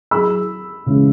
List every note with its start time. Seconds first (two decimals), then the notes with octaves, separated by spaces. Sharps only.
0.11 F#3 E4 G#4 B5 E6
0.86 C#3 E3 G#3 E4